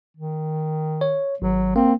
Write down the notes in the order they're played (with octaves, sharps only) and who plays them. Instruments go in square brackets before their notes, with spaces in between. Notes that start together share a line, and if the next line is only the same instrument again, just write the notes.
[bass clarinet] D#3
[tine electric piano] C#5
[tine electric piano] G#1 [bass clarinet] F#3
[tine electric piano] A#3 [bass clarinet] C4